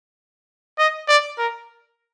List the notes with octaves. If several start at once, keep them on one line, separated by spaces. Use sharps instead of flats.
D#5
D5
A#4